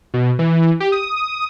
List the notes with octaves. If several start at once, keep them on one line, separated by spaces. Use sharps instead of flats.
B2
E3
G4
D#6